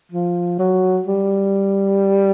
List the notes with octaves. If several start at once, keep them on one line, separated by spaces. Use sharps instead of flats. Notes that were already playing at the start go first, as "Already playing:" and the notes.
F3
F#3
G3